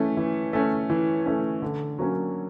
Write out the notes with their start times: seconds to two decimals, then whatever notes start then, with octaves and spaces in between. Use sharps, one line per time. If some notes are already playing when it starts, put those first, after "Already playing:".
Already playing: E3 A3 C#4
0.17 E3
0.53 A3 C#4
0.90 E3
1.26 A3 C#4
1.62 D3
1.99 F#3 A#3 C#4